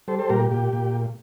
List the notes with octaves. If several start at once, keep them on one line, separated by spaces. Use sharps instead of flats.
G3 A4 C5
A4 C5
A#2 G4 A#4
G4
A#2 G4
A#2